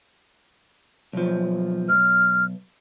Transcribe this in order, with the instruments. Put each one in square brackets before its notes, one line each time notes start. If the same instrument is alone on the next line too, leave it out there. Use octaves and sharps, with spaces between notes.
[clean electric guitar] B1 F3
[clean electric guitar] B1 G#2 [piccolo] F6